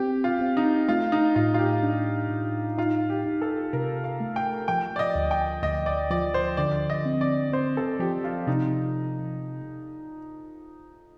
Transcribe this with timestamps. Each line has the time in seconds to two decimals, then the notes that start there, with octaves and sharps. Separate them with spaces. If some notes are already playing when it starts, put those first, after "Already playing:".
Already playing: C4 G4
0.24 F4
0.41 C4
0.57 D#4
0.89 A3 F4
1.12 D#4
1.35 A2 F4
1.54 F4
1.59 G4
1.83 D4
2.30 A2
2.78 D#4 F4
3.10 G4
3.26 D#4
3.42 A4
3.73 C3 A#4
4.04 F5
4.20 A3
4.36 G5
4.68 F3 G5
4.96 D5
4.99 D#5
5.15 D2
5.31 G5
5.63 D2 D#5
5.86 D5
6.11 F3 D5
6.34 C5
6.57 D3 D5
6.90 D#5
7.06 C4
7.21 D5
7.52 C4 C5
7.77 A4
8.00 F3 G4
8.24 F4
8.47 C3 D#4